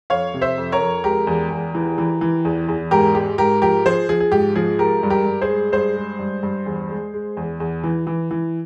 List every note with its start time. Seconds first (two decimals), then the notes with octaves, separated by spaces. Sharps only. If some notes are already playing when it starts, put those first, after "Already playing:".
0.10 F2 C#5 F5
0.34 C3
0.41 C5 E5
0.58 F2
0.72 A#4 C#5
0.81 F2
1.04 G#3 G4 A#4
1.27 E2
1.51 E2
1.75 E3
1.98 E3
2.21 E3
2.45 E2
2.68 E2
2.91 G#2 G4 A#4
3.15 G#3 G4
3.38 G#2 G4 A#4
3.62 F3 G4 A#4
3.86 F3 G#4 C5
4.09 F3 G#4
4.20 G#4
4.32 G#2 G4
4.56 F3 G#4
4.79 G#3 G4 A#4
5.03 G2
5.10 G4 A#4
5.25 G2
5.41 G#4 C5
5.49 G#3
5.72 G2 G#4 C5
5.97 G#3
6.19 G2
6.43 G2
6.66 E2
6.90 G#3
7.14 G#3
7.37 E2
7.60 E2
7.84 E3
8.07 E3
8.31 E3